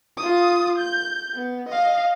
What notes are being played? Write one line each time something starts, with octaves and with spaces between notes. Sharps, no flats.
F4 D#6
G6
B3
D#5 F5